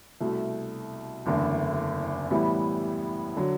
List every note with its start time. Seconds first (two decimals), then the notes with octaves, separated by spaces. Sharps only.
0.21 C2 B2 A3
1.26 F#1 E2 D3 A3 E4
2.31 A2 E3 G3 B3 E4
3.37 D3 F#3